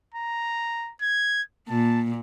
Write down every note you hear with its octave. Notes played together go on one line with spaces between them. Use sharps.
A#5
G#6
A#2 A5